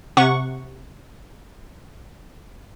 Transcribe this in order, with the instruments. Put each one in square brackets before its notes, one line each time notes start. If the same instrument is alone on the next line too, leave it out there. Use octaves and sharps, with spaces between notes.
[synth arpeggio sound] C3 F#5 C#6